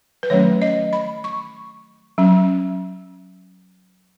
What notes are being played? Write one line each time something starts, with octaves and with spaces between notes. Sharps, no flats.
B4
D#3 F#3 A3 C#4 C#5
D#5
B5
C#6
F#3 C#4